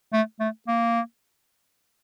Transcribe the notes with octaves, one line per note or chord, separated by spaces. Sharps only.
A3
A3
A#3